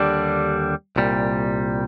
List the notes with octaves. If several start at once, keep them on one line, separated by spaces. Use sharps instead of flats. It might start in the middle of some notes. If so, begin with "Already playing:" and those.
Already playing: D#2 D3 G3 D4
C2 A#2 G3